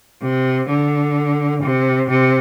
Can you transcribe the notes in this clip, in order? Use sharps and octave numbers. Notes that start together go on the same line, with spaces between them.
C3
D3
C3
C3